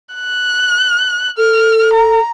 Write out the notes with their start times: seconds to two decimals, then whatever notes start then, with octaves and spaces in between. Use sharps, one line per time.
0.15 F#6
1.38 A4 F6
1.93 A#5